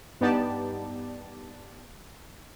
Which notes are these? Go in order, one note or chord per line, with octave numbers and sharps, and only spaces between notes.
G2 B3 D#4 G4 D5 A5